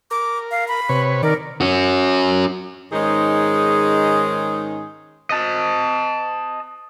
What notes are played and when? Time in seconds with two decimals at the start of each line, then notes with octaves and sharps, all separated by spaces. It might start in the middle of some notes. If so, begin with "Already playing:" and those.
0.11 A#4 D6
0.51 F5
0.68 B5
0.89 C3 B4 C#5
1.23 D#3 A#4 D5
1.61 C#4 F#4
2.92 G#2 D#3 G#3 C#4 D#4 G#4
5.31 D#5 A5